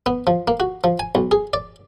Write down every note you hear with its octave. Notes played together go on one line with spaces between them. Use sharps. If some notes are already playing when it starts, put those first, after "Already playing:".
B3
F3
A#3
F#4
F3
G#5
B1
G#4
D5